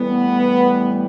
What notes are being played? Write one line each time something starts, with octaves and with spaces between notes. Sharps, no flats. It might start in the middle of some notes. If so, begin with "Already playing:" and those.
Already playing: A2 E3 G3 B3